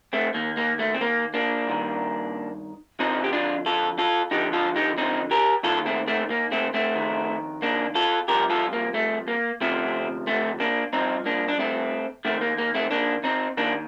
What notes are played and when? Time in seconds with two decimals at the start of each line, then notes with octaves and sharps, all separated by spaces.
0.13 A3 C4
0.34 D#2 D#3 A#3
0.57 A#3
0.79 A3
0.94 C4
1.01 A#3
1.34 A#3 D4
1.67 G2 D#3
2.99 F2 D3 F3 C4 D#4
3.24 G4
3.33 D4 F4
3.66 F4 A4
3.98 F4 A4
4.31 F2 D3 F3 D#4 G4
4.53 F4 A4
4.76 D#4 G4
4.98 C4 D#4
5.31 G4 A#4
5.63 D#2 D#3 F4 A4
5.86 A3 C4
6.07 A3 C4
6.30 A#3
6.52 A3 C4
6.74 A3 C4
6.96 F2 D#3
7.62 A#3 D4
7.95 F4 A4
8.28 C2 C3 F3 G4 A#4
8.50 F4 A4
8.73 A#3
8.94 A3
9.28 A#3
9.61 D2 C3 F3 A3 C4
10.27 A3 C4
10.60 A#3 D4
10.93 G2 F3 C4 D#4
11.26 A#3 D4
11.48 D4
11.59 A3 C4
12.25 F2 D#3 A3 C4
12.41 A#3
12.58 A#3
12.75 A3 C4
12.91 A#3 D4
13.24 C4 D#4
13.57 D#2 D#3 A#3 D4